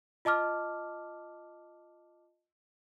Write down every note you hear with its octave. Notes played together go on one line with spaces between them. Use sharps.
F4 D#5 A5 D6 F6